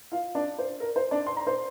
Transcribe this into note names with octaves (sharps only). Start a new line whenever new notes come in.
F4 F5
D4 D5
C5
A#4
C5
D4 D5
C6
A#5
C5 C6